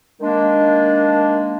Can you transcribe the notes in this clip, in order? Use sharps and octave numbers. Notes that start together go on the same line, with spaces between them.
D#3 G#3 A#3 D4